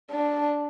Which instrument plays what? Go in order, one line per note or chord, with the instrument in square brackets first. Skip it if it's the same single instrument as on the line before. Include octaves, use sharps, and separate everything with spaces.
[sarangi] D4